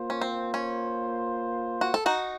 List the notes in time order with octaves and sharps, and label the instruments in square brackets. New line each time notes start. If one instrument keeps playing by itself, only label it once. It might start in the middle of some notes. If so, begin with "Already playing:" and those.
Already playing: [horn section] A#3 F4 C5
[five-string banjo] C#4
C4
C#4
F#4
A4
D#4 F#4